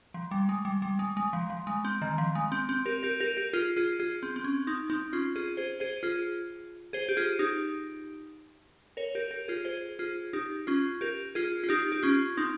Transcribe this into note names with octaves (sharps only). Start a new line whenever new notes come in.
F3
G3
G#3
G3
G3
G#3
G#3
F3
F3
G#3
C4
D#3
F3
G#3
C4
C4
G4 A#4
G4 A#4
G4 A#4
G4 A#4
F4 G#4
F4 G#4
F4 G#4
C4
C4
C#4
C4 D#4
C4 D#4
C#4 F4
F4 G#4
G#4 C5
G#4 C5
F4 G#4
G#4 C5
G4
F4 G#4
D#4 G4
A#4 C#5
G4 A#4
G4 A#4
F4 G#4
G#4 C5
F4 G#4
D#4 G4
C#4 F4
G4 A#4
F4 G#4
F4
D#4 G4
G4
C#4 F4
C4 D#4